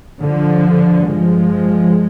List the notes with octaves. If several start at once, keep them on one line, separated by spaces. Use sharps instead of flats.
G2 D3 F3
F3 G#3